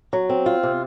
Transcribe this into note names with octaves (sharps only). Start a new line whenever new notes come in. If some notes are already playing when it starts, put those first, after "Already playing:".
F#3
C4
F4
C3